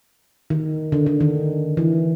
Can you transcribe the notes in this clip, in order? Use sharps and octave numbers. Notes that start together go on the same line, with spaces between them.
D#3
D3
D3
D#3
E3